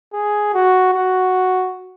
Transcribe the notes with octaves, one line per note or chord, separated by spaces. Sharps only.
G#4
F#4
F#4